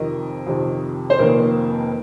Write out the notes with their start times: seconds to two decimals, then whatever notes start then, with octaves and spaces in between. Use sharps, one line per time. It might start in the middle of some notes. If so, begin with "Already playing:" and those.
Already playing: F2 C3 D#3 A#4 D#5
0.47 F2 C3 D#3
1.10 C5
1.19 F1 F2 D#3 A#3 A#4